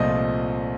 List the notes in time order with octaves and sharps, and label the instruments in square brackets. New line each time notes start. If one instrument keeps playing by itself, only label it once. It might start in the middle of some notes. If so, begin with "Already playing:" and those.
Already playing: [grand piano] C2 A#2 F3 A3 C4 D#5